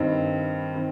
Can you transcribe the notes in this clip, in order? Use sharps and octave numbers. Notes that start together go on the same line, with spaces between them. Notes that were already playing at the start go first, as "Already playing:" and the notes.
Already playing: G2 D#3 G3 C4 D#4
D#3 C4